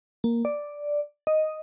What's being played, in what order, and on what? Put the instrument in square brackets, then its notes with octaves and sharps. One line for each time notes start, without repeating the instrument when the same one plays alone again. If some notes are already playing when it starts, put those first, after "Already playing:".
[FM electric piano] A#3
D5
D#5